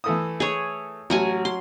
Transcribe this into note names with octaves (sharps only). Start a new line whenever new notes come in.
E3 A3 D#6
G#4 C#5
A1 F#3 F#5 G#5
C6